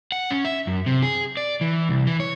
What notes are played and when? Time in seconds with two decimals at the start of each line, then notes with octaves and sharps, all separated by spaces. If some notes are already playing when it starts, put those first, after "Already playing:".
0.12 F#5
0.30 C#4
0.45 E5
0.67 F#2
0.86 C3
1.02 G#4
1.37 D5
1.61 E3
1.89 C2
2.07 E3
2.20 C#5